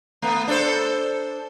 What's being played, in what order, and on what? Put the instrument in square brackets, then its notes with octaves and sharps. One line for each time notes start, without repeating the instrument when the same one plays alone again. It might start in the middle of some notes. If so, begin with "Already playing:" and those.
[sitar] A3 B3
D4 A4 C5